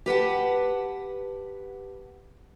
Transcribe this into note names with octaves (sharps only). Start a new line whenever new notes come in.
G4 B4 F#5 A5